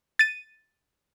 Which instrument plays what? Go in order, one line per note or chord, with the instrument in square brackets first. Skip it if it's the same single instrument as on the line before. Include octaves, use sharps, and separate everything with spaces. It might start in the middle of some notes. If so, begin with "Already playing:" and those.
[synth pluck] A6 D#7